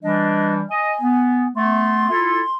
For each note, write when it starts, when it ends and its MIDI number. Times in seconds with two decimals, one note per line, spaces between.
0.03 0.62 52
0.03 0.62 55
0.03 0.62 62
0.03 0.54 75
0.70 0.93 75
0.70 1.48 80
1.01 1.48 59
1.55 2.08 57
1.55 2.08 59
1.55 2.58 84
2.10 2.41 64
2.10 2.41 65
2.10 2.41 69